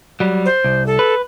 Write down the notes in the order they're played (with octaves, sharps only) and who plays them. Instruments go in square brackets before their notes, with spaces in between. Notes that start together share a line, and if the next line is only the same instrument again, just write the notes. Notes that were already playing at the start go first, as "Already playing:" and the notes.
[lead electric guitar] F#3 G3
[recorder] C5
[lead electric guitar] C2
[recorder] A4
[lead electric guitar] B4